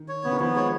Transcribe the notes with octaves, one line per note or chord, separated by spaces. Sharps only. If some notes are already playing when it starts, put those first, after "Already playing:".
Already playing: D#3
C#5
C#3 B3
D#3
F3 B3
G#3 C#5